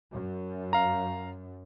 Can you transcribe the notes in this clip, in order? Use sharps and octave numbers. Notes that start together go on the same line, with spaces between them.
F#2
F5 A#5